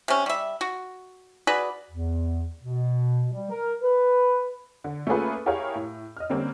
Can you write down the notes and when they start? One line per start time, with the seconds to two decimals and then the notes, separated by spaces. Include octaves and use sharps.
0.08 C3 C#4
0.26 G3 E5
0.61 F#4
1.47 F#4 G#4 B4 D5
1.91 E2
2.62 B2
3.33 G3
3.51 A#4
3.82 B4
4.84 D3
5.07 A3 A#3 C#4 F4 G#4 B4
5.46 E4 G4 G#4 A#4 C#5 F5
5.75 A2
6.17 D#5 F6
6.30 D3 G3 A#3 C4 C#4